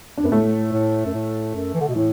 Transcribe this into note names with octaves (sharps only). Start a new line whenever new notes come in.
D4
F#2 B3
A2 A3
A2
F#2
A2
F#2
E3
D3
B2
A2 E3